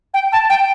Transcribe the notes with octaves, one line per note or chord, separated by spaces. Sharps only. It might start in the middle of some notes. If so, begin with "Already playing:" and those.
G5
A5
G5